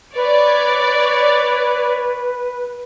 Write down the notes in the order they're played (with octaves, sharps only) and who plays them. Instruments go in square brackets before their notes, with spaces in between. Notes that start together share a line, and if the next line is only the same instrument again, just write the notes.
[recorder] B4 [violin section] C#5 D5